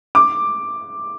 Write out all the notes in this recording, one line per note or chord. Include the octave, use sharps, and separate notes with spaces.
D6